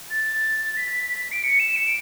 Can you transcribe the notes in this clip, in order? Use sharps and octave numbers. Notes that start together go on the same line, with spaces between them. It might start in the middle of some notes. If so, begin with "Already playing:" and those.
A6
B6
D7
C#7
E7
C#7
D7